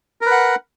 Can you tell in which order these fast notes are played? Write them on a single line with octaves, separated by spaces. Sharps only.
A#4 B4 F#5